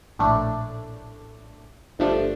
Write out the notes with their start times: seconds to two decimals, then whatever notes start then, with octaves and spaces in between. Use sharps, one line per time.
0.19 A#1 A2 A3 D4
1.99 G1 G2 F3 A3 D4